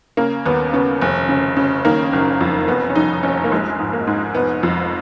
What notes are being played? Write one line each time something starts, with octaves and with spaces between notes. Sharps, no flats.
C#3 A#3
D#2 B3
C#3 B3
F1
C#3
C#3
D#3 A#3
F#1
F2
F1 B3
C#4
F1 D#4
F1 C#4
A#3
A#1 G#3
G#2
A#3
G#2
F1 B3
F2